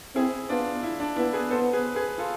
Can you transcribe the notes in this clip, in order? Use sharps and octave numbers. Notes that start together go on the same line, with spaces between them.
C4 E4 G#4
B3 D4 F4
E4
D4
B3 E4
G#4 B4
B3 A4 C5
G#4 B4
G#4 B4
F4 A4